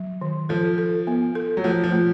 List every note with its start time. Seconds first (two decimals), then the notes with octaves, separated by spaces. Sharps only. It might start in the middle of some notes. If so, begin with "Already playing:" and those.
Already playing: F#3
0.21 D#3
0.49 F3 A4
0.78 A4
1.07 B3
1.35 A4
1.57 F#3
1.64 F3 A3
1.84 F3
1.92 A3